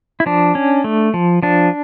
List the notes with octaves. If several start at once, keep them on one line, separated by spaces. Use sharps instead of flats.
E4
F3 D4
C#4
A3
F3
F3 D4